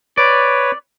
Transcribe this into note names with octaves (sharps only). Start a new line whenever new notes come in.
B4 C#5 D5